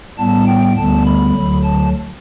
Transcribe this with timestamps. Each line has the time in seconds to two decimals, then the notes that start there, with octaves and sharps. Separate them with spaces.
0.19 A2 G3 B3 A5
0.47 G5
0.76 D2 D3 G3 B3 A5
1.06 B5
1.34 D2 D3 F#3
1.64 A5